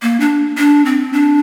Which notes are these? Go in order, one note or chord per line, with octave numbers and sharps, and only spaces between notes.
A#3
D4
D4
C4
D4